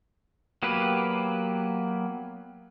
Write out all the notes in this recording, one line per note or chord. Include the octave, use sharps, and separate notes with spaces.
F#3 A#3 B3 G4 B4